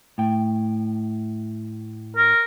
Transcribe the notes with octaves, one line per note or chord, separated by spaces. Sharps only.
A2 G5
A#4